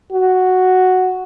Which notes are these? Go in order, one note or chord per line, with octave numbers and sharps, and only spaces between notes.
F#4